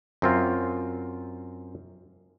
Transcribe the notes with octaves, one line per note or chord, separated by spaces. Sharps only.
F#2 C4 F4